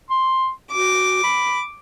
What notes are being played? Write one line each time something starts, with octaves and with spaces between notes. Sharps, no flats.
C6
F#4 D6
B5